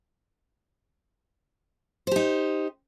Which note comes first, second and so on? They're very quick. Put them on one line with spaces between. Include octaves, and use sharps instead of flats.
C5 G4 D#4